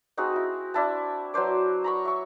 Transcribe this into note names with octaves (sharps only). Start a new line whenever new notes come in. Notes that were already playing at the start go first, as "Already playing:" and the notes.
C4 D#4 F#4 G#4
E4
D4 E4 A5
F#3 B4 C5 D5
A#5 B5 C#6
E5 C#6